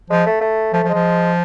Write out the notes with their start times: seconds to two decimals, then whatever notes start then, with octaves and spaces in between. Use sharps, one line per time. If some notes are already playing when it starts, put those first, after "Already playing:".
0.10 F3 G#3
0.26 A3
0.41 A3
0.73 F3 A3
0.84 F3
0.89 G#3
0.94 F3